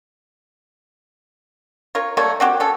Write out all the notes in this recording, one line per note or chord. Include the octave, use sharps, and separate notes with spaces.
F4 A#4 C#5
G3 A3 A#3 C#5
C4 F#4 G4
C#4 A4